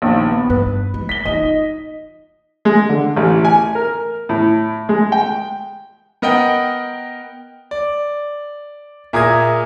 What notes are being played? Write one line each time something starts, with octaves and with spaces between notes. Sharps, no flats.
A#1 D#2
B3
G2 B4
G#3
B6 G7
D#4 F4 D#5
G#3
D3
A1
G#5
A#4
A2
G#3
G5
B3 A#4 D#5 F#5 G5
D5
A#2 G#4 A#4 E5 D#6 G#6